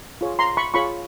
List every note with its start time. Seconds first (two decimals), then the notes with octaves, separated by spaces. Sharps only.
0.21 F4 G#4 C#5
0.39 A#5 C6
0.57 B5 C#6
0.74 F4 G#4 C#5 B5 C#6